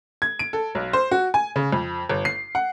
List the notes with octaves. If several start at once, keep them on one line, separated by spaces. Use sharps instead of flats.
G#6
D7
A4
B1
C5
F#4
G#5
C#3
F2
G1
C7
F#5